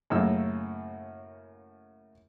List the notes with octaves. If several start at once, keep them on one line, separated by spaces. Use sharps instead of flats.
F#2 A2 C#3 A#3 E6